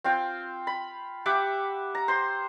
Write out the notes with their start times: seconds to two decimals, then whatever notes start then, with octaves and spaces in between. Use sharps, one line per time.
0.04 C4 F4 F5 G5
0.67 B5
1.26 G4 E5 F#5 D6
1.95 A#5
2.08 C5 C6